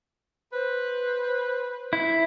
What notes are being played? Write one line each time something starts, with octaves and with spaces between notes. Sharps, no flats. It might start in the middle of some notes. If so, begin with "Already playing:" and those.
B4 C5
E4